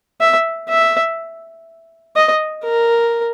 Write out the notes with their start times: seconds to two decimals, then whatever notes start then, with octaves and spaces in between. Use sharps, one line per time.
0.21 E5
0.69 E5
2.16 D#5
2.65 A#4